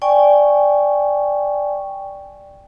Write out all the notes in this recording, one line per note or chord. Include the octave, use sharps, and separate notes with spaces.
D5 G5 G#5 C#6